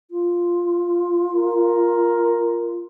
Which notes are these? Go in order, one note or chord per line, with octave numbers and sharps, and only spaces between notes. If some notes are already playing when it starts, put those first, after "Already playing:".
F4
A#4